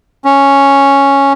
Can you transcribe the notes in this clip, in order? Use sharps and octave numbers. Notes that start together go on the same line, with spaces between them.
C#4